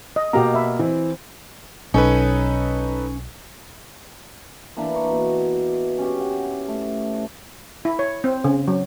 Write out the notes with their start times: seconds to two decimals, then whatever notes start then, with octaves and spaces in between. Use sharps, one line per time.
0.16 D#5
0.33 B2 A#3 F#4 G4 A#5
0.54 E5 B5
0.79 E3 C4
1.94 B1 C#4 D#4 A4 B4
4.77 E3 A#3 D4
4.96 C#6
5.10 B2
5.98 C#4 G4
6.21 F#5
6.68 A3
7.85 E4
7.99 C#5
8.24 C4
8.44 C#3
8.68 F#3